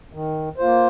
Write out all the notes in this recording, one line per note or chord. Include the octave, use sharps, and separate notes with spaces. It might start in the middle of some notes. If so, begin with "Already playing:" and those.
D#3
A#3 F4 C5